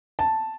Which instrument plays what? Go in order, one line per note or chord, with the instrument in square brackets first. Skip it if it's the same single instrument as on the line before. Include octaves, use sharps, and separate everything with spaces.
[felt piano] A5